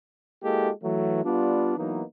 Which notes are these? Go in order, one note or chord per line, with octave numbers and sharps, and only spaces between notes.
G#3 A#3 E4 F#4 G4 A4
E3 F#3 A3
G3 B3 D4 F4
E3 F#3 A#3 B3 D#4